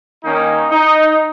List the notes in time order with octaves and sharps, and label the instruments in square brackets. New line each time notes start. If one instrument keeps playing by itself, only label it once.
[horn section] D#3 A#3 C#4 D#4
D#4